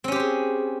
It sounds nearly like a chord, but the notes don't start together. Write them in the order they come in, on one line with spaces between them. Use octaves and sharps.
C4 C#4 G4 C5 G#4